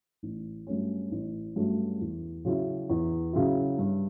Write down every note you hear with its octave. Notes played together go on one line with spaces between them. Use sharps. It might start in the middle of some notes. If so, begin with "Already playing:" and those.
A1
G2 F#3 A3 C#4
A1
G2 F#3 A3 C#4
E2
C#3 F#3 C#4 E4
E2
C#3 F#3 C#4 E4
G2